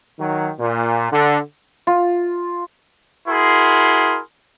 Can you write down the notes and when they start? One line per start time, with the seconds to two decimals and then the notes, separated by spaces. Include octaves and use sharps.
0.19 D#3 F#3
0.60 A#2
1.13 D3
1.87 F4
3.28 E4 F#4 G#4 A#4 C6